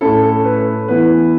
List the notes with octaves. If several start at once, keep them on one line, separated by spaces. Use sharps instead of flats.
A2 A3 C#4 E4 A4
A4
B4
E3 B3 E4 B4